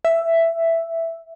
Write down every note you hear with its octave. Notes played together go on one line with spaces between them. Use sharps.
E5